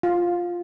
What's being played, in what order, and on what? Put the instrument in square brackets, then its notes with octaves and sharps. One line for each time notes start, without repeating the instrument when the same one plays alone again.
[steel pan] F4